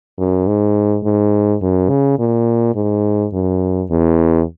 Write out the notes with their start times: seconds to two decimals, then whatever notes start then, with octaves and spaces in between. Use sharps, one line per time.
0.18 F#2
0.47 G#2
1.04 G#2
1.62 F#2
1.89 C#3
2.19 A#2
2.75 G#2
3.33 F#2
3.90 E2